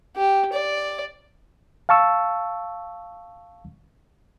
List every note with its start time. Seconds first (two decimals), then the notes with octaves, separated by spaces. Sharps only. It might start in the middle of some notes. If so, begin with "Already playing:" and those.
0.16 G4
0.53 D5
1.89 F5 A5 C#6 E6